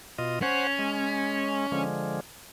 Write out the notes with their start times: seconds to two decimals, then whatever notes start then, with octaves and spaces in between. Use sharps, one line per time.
0.18 B2 F4 D#5
0.42 C#4 C5 C#5 F#5
0.79 G#3
1.72 D3 F3 G#3